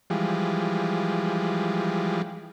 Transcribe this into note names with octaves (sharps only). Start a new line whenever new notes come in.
E3 F3 G3 G#3